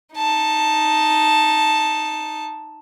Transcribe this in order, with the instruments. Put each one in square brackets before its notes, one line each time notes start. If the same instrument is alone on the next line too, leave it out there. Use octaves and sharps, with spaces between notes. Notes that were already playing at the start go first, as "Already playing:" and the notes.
[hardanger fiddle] D#4 A5